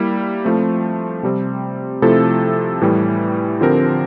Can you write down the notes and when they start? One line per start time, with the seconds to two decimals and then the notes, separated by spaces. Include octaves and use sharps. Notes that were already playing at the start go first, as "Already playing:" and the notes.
Already playing: G3 A#3 E4
0.45 F3 A3 C4
1.23 C3 G3 C4
2.02 C3 F3 A3 E4 A4
2.81 A2 E3 G3
3.61 D3 F3 C4 G4 A#4